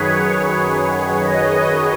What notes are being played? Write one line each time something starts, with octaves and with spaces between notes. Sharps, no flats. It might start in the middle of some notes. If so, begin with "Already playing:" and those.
Already playing: F#2 D#3 F#3 G#4 B4 C#5
D#5